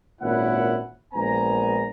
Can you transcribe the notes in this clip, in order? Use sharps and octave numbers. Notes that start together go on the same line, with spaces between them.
G#1 A#2 C#4 E4 B4 F#5
A#1 G#3 B3 G#5 A#5